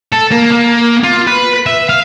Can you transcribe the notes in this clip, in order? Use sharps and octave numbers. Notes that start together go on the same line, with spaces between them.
A4
A#3
A#3
F4
B4
E5
F5